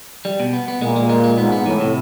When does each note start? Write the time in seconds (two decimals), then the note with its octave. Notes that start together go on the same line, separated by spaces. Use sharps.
0.25 G3
0.40 B2
0.53 B3
0.68 B3
0.81 A#2 G#3
0.96 G#3
1.10 G#3
1.24 G#3
1.38 G#2 B3
1.52 B3
1.66 A2 E3
1.80 C3